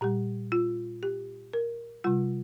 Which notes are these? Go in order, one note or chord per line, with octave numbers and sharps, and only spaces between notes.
A#2 G3 G4
F4
G4
A#4
C3 G3 F4